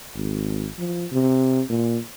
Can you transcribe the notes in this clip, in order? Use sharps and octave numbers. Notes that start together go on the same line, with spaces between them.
G#1
F3
C3
A#2